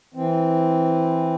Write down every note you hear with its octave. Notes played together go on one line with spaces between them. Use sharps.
E3 C4